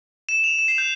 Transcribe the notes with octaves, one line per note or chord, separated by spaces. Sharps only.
E7
F7
E7
C7
G6